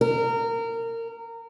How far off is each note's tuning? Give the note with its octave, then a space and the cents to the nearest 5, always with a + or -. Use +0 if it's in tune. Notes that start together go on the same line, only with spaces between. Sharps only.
A#4 -25